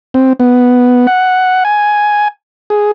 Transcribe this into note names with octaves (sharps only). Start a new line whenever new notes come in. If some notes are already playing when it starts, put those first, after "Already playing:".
C4
B3
F#5
G#5
G#4